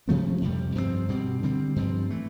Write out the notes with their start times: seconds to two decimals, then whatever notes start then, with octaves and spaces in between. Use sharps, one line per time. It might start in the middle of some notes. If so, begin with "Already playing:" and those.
0.08 C3 F3 A3 C4
0.41 F2 C3 G3
0.75 G2 F3 A3 C4
1.09 B2 G3 C4
1.43 D3 G3 C4
1.76 G2 F3 C4
2.10 E3 A3